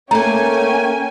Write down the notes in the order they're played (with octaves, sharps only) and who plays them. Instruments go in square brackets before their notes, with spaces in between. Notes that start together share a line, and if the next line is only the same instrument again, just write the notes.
[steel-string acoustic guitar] A3 A#3 [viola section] C#4 G#5 [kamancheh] C#5 G5 [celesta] A#5